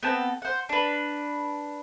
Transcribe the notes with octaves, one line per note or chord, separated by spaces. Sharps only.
B3 C4 A4
C5 F#5
D4 B4